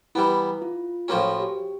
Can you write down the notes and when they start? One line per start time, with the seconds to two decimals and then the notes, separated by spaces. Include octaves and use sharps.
0.15 E3 G3 B3 E4
0.62 F4
1.08 A2 F3 A#3 C#4 F#4
1.40 G4